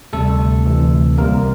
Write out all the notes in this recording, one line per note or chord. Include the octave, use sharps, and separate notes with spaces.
D2 C3 G3 A3 A4
D2 C3 E3
C2 C3 G3 A#3 A#4